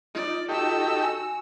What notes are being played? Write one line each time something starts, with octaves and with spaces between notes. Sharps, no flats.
D#4 F4 D5
D#4 F#4 G4 A4 E6
G#5